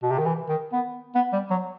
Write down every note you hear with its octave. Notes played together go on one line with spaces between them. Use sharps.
B2
C3
D#3
E3
D#3
B3
B3
G3
F#3